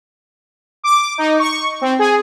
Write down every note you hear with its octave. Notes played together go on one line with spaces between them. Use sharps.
D6
D#4
C#6
C4
G#4